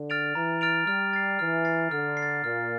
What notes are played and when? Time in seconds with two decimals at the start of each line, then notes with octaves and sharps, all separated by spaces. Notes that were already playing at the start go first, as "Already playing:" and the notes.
Already playing: D3
0.10 F6 A6 D7 F7
0.35 E3 A#5
0.61 F6 A6 D7 F7
0.87 G3 F6
1.13 A6 C7
1.39 E3 F6
1.65 A6 C7
1.91 D3 F6
2.17 C7
2.22 A6
2.44 A#2 F6